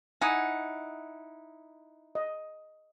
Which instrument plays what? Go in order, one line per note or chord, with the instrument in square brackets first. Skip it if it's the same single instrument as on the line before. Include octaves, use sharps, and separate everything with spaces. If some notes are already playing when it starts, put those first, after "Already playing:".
[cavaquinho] D#4 E4 F#5 [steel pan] G#5 D#6
[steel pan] D#5